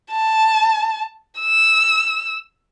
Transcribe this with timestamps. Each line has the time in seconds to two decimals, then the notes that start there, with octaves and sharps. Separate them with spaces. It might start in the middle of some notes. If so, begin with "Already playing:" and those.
0.11 A5
1.40 E6